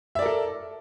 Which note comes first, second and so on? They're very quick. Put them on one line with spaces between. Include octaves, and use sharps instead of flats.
E5 D5 A#4 A4